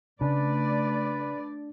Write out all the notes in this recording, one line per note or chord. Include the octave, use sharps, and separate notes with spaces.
C#3 A3 D4 B4 D5